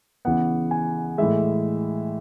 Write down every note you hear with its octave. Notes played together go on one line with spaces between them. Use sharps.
C#3 E3 B3 F#5
G#5
A2 E3 G#3 E5